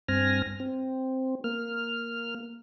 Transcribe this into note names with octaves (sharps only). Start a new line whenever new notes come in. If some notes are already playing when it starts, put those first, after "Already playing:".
G2 C4 G#5 F6 A#6
C4
A#3 F6